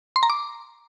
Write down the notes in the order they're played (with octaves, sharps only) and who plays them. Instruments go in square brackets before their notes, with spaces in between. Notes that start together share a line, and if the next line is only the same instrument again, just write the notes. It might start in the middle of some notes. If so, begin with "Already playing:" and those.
[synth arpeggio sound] C6
A#5
D6